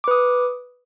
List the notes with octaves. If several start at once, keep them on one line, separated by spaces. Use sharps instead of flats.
B4 D6 D#6